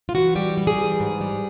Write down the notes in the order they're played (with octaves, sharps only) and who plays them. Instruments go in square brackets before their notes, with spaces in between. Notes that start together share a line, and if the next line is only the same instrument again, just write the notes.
[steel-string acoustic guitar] F4
E3 F#4
G3 G4
G3
G#4
E3
G#2
G3